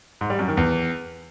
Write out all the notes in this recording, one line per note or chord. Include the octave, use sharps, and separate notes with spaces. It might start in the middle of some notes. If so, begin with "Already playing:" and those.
G#2
G3
F#2
D#3
E2